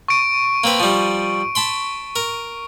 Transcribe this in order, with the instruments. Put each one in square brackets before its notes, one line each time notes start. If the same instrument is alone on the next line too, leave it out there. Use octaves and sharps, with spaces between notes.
[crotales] C#6 D7
[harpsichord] A#3 C4 B4
F3 G3
A5 B5 C6
A#4